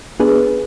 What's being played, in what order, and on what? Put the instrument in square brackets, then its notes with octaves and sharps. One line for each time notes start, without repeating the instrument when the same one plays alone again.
[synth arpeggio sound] B3 D4 G#4 B4